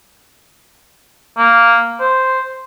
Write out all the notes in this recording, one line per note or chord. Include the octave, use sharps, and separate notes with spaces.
A#3
C5